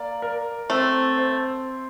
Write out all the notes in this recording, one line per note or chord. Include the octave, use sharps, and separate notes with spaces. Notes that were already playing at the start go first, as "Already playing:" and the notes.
Already playing: A#3 D5
A#4
A3 C4
C5